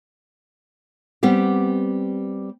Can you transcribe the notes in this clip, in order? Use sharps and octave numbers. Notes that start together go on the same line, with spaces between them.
G3 B3 C4 G4